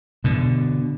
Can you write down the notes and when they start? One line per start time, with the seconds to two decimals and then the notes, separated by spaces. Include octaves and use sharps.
0.24 B2 D3